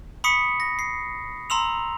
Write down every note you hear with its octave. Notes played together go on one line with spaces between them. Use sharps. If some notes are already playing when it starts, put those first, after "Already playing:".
B5 C#6 D#6 B6 C#7
A#6
C7
A#5 C6 E6 F7